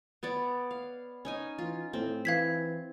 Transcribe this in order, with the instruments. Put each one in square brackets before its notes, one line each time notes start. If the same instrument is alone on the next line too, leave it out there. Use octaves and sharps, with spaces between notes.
[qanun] B3 C#5 D5
F5
C#4 D#4 G#5
[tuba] E3 [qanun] F4
[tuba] A2 [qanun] C4
[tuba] E3 [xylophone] F5 G#6 B6